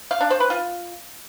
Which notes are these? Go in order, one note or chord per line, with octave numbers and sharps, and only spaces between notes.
F5
D4
C5
B4
F4